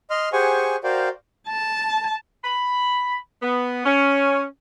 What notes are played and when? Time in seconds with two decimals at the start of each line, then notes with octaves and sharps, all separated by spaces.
0.10 D#5 C6 F6
0.33 G4 G#4 C5 F#5 G#5 C#6
0.84 F#4 A#4 C5 D5 F5 G5
1.48 A5
2.44 B5
3.43 B3
3.86 C#4